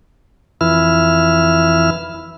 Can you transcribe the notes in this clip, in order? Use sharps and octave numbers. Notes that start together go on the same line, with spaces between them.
F2 E3 E4 F6